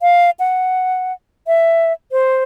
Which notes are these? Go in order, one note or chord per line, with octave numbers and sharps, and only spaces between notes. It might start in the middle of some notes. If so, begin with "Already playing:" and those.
F5
F#5
E5
C5